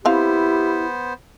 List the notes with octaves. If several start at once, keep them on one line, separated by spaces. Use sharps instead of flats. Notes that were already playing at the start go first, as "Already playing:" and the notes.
F3 B3 C4 E4 G4 C5 F5